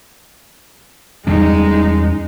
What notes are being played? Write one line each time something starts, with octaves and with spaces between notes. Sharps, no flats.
E2 G3 G#3 C#4 D#4